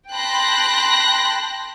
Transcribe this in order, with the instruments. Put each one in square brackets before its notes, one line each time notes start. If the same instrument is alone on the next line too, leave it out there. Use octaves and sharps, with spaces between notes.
[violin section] G5 A5 B5 C6 F#6 A#6